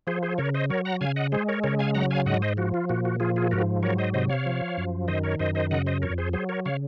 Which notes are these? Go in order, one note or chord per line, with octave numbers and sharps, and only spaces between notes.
F3 G#4 C5
G#4 C5
C#3 A#4 C#5
C5 D#5
F#3 A#4 C#5
F#5 A#5
C#3 F5 G#5
D#5 F#5
G#3 G#4 C5
A#4 C#5
C#3 A#4 C#5
F5 G#5
F#3 F#5 A#5
F5 G#5
G#2 D#5 F#5
C5 D#5
F3 F#4
F4
A#2 F#4
F#4
F3 F4 G#4
F4 G#4
G#2 F#4 A#4
F#3 A#4 C#5
C5 D#5
C3 C5 D#5
C#5 F5
F3
F#2
D#3 C5 D#5
A#4 C#5
F#2 C5 D#5
C5 D#5
C#3 D#5 F#5
C5 D#5
F2 A#4 C#5
G#4 C5
F#3 G#4 C5
A#4 C#5
C#3 C#5 F5